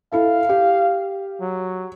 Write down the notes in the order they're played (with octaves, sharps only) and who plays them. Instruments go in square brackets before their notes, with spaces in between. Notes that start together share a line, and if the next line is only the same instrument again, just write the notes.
[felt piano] E4 A4 [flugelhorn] F5
[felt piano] G4
[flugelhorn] F#3